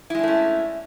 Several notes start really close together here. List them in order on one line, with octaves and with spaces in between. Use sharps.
E4 G#3 D4 A3 C#4